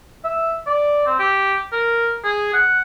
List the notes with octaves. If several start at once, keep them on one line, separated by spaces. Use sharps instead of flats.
E5
D5
C4
G4
A#4
G#4
F#5